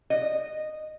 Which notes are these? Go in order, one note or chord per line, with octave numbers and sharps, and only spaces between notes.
D#5